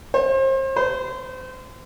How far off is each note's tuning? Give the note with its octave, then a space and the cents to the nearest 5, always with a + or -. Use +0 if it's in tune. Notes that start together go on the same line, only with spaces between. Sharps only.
C5 +35
C5 -35